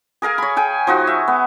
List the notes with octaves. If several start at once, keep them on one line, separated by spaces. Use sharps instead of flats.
G#4 A#4 F5 G#5
C#5 B5
G#4 G5 G#5
F3 D#4 F#4
E5
B3